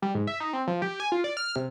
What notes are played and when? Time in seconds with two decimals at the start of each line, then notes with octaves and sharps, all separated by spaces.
0.02 G3
0.15 G#2
0.27 E5
0.40 D#4
0.53 C4
0.67 F3
0.82 G4
1.00 G#5
1.12 F4
1.24 D5
1.37 F6
1.56 C3